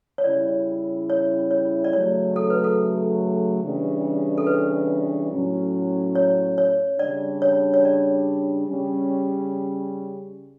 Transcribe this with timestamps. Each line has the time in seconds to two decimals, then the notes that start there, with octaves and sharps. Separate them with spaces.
0.18 C#5
0.24 C#3 G3 C#4 E4 D5
1.10 C#5
1.51 C#5
1.84 D5
1.93 C#3 F#3 A3 C#5
2.36 A4
2.50 B4
2.64 A4
3.63 C#3 E3 G3 D4
4.38 A4
4.47 B4
5.31 A2 F#3 C#4
6.15 C#5
6.58 C#5
6.99 C#3 G3 D4 D5
7.42 C#5
7.74 C#5
7.85 D5
8.69 C#3 G3 C#4